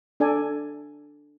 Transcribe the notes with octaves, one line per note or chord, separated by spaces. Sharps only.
D4 A4 D5 G#5